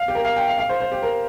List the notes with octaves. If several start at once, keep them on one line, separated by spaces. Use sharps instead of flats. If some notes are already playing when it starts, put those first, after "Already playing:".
Already playing: F5
G4
A#4
F5
G5
F5
F5
C5
C5
G4
A#4